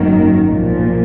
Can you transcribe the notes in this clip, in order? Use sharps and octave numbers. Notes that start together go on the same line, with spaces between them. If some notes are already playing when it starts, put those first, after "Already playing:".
Already playing: G#1 F#2 D#3 F#3 A#3
B1 A#2 F3